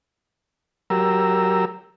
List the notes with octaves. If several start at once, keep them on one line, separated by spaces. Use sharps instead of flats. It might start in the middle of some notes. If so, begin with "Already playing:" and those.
F#3 G4 A#4 A#5 E6